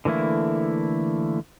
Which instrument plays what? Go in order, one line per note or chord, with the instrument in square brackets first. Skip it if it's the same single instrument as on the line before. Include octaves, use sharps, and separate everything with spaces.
[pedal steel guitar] D3 E3 A3 A#3 E4